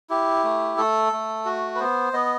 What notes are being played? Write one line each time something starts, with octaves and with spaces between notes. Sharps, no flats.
E4 G4
A3
A3 A4
A3
F#4
B4
B3 C5
B3 D#5